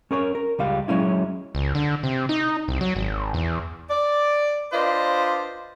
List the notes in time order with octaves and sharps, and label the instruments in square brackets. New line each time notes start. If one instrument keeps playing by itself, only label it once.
[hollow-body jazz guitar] C#4 A#4 C#5
A#4
C#2 G3 F5
F#3 G#3 C#4 E4
[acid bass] C#2
D3
C3
D#4
C2
F#3
G#1
E2
[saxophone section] D5
D4 F4 B4 C5 D5 D#5